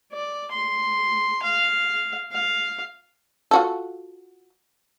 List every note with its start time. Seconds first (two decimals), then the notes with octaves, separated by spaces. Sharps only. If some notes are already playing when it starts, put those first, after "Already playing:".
0.12 D5
0.52 C6
1.43 F5
2.32 F5
3.51 F4 F#4 A4